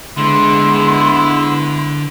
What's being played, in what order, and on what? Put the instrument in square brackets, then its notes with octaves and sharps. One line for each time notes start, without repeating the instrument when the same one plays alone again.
[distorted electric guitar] D3 [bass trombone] G#3 [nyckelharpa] B3 E4 [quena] C6